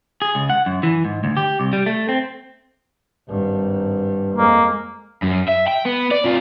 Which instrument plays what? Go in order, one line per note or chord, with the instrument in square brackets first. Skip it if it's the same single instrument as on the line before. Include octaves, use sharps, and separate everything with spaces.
[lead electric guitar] G#4
C#2
F#5
F#2
E3
G#2
D2
G4
C2
G3
A3
C4
[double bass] G#1 G2
[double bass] F2 G#3 [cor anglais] A#3
[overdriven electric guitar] F#2
E5
G5
B3
D5
C3 F4